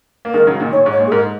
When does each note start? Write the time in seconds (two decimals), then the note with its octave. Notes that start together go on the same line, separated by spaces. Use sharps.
0.25 A#3
0.33 D#3 G#3 A#4
0.47 C#3 F#3
0.60 A#2 D#3
0.72 A#2 C#5
0.86 G#2
0.92 C#5
1.00 A#2
1.07 G#4
1.12 G#2 A#4